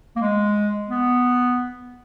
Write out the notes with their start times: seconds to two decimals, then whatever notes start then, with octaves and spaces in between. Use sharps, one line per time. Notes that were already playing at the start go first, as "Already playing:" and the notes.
0.16 A#3
0.21 G#3
0.89 B3